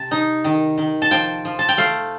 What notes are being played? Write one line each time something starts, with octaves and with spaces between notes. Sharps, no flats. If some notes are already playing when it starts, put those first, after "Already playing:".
Already playing: C3 A5
D#4
D#3
D#3
A5
F3 G5
F3
A5
G5
A3 F5